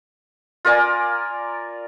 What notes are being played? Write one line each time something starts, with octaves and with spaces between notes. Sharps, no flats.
F4 A#4 D5 G#5